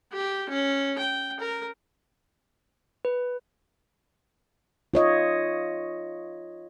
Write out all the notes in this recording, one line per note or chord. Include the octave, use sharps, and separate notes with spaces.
G4
C#4
G5
A#4
B4
F4 C#5 D#5